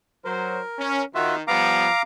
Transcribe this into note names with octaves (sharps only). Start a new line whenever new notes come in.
F#3 A#4 C5
C#4
D#3 F4 F#4 E5
F3 G3 B3 F5 A#5 D6